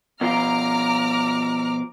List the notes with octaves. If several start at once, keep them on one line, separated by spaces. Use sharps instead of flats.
B2 F3 F4 A#5 D6 F6